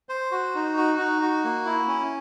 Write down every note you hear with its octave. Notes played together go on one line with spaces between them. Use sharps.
C5
F#4
D#4
F#4
D#4
F#4
A#3
E4
C#4